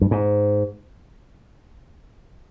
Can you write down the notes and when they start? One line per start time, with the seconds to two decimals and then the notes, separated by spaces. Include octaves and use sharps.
0.01 G2
0.11 G#2